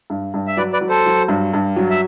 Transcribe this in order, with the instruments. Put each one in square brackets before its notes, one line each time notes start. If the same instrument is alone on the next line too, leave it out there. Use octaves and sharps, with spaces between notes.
[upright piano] G2
G2
[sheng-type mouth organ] E5
[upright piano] F#3 [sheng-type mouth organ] B4 D5
[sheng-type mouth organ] B4 D5
[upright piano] F#3
[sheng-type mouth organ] A4 C5
[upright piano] F#3
G2
G2
F#3
[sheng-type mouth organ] E5